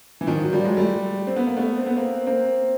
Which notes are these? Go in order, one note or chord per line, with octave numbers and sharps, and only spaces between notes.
E3
D#3 F3
F#3
F3 G3
F#3 G#3
G3 A3
C4
B3
A#3
A3 B3
C4
B3
A#3 C4
A#3 C4